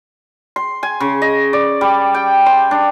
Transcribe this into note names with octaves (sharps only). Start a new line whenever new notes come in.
C6
G#5
C#3
D#5
D5
G3
G5
C6
D4